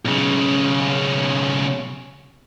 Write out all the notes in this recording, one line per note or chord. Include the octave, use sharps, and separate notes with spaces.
B1 C#3